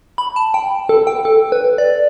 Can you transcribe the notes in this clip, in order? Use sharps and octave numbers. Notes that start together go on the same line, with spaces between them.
B5
A5
G5
A4
G5
A4
B4
D5